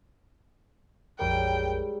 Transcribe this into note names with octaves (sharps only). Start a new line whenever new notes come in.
A#1 F2 G#2 F#3 G3 A#4 G5